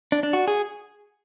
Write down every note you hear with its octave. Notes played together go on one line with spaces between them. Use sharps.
D4
D4
F#4
G#4